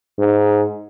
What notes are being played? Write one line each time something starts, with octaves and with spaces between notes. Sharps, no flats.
G#2